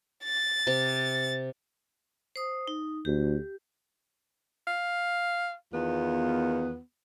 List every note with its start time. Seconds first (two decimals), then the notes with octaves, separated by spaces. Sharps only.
0.24 A6
0.67 C3
2.36 C5 D#6
2.68 D#4
3.05 D2 G4
4.67 F5
5.74 E2 D#3 B3 F4